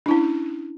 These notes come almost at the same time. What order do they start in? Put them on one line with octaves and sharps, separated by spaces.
D4 E4 C#4